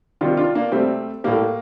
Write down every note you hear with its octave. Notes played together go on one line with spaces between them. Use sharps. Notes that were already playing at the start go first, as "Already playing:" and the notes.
C3 D#3 G3 D4 F4
D4 F4
A#3 D4
C3 G3 A3 C4
A2 G3 A#3